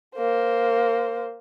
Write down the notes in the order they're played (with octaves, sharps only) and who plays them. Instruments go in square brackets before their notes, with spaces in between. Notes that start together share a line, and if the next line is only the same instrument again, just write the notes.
[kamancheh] A#3 C5